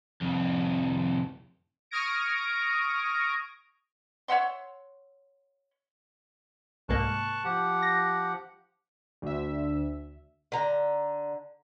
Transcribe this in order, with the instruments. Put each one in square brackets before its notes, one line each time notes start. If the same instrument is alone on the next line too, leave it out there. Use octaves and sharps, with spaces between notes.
[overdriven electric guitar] C2 F2
[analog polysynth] C#6 D#6 F6 G#6 A#6 D7
[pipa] C#5 E5 F#5 C6
[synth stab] C2 G#2 A#3 [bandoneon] A5 C#6 F#6
[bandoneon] F3 G4 F#5
[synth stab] A#6
[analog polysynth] D2 E5
[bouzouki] D3 A#5